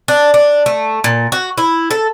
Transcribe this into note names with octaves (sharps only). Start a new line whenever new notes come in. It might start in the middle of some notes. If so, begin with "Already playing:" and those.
D4
D4
A3
A#2
F#4
E4
A4